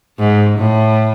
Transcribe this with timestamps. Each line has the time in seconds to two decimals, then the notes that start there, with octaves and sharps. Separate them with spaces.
0.19 G#2
0.58 A2